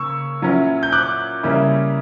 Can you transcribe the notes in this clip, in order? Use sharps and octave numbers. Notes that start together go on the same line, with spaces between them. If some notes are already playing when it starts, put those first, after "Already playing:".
Already playing: C#3 A#3 C#6 E6
A#2 F#3 C#4 E4
G6
D6 F#6
C#3 G3 A#3 C#4 E4